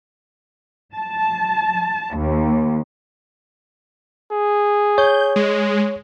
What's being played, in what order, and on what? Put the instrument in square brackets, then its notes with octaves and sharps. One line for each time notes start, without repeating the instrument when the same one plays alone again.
[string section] A5
D#2
[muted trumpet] G#4
[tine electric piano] C#5 [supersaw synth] G6
[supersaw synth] G#3